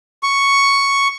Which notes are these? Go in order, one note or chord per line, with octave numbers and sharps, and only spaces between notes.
C#6